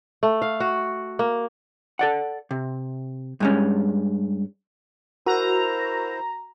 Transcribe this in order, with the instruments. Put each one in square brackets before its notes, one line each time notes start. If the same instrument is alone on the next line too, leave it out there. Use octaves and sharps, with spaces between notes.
[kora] A3
F5
F#4
A#3
[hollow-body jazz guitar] A4 D5 F#5
C3
G2 G#3 C#4
[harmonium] E4 C5 [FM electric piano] F#4 [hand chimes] A#4 F#6 [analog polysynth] A#5